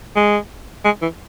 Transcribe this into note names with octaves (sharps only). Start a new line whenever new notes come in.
G#3
G#3
E3